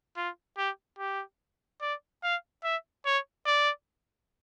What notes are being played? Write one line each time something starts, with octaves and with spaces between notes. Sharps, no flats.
F4
G4
G4
D5
F5
E5
C#5
D5